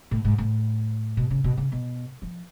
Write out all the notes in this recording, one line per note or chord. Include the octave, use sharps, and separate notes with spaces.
A2
G#2
A2
B2
C#3
B2
C#3
B2
F3